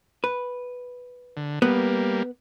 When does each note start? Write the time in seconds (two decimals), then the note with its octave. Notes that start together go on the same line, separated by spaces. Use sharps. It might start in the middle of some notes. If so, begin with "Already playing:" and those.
0.24 B4
1.37 D3
1.62 G3 A#3 B3